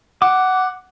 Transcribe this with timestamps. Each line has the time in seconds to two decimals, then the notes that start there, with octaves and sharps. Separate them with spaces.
0.22 F#5 D6